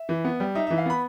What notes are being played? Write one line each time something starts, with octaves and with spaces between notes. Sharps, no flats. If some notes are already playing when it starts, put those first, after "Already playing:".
Already playing: E5
E3
B3
G3
D#4 E5
E3 E5
F5
B3 B5